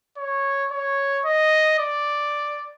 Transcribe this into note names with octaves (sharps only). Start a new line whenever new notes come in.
C#5
C#5
D#5
D5